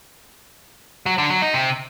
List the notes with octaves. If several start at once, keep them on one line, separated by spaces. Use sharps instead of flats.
F#3
D3
F#3
D#4
C3